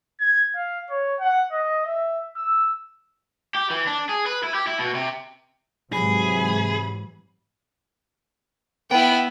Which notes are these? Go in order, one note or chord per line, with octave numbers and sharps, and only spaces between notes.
G#6
F5
C#5
F#5
D#5
E5
E6
G4
E3
D4
G#4
B4
E4
G4
E4
B2
C3
G#2 C3 E3 F#3 G#4 B5
B3 E4 G5